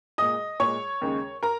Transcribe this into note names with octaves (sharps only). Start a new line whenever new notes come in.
A#2 G#3 D#5 D#6
A#2 G#3 C#5 C#6
D#2 C#3 G#3
A#4 A#5